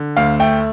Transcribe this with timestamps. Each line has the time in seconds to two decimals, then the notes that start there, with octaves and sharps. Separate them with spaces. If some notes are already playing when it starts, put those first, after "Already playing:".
Already playing: D3
0.17 D2 F5
0.40 A3 G5